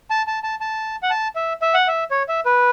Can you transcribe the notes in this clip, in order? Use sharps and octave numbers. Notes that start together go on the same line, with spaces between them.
A5
A5
A5
A5
F#5
A5
E5
E5
F#5
E5
C#5
E5
B4